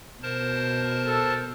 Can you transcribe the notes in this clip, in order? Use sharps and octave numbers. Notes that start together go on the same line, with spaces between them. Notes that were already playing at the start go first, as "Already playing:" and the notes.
B2 A#4 C5 A5
A4